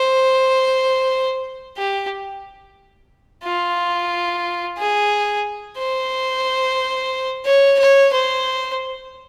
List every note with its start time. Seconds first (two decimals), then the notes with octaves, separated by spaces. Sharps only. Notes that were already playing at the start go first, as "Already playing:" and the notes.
Already playing: C5
1.77 G4
3.44 F4
4.78 G#4
5.78 C5
7.45 C#5
7.79 C#5
8.12 C5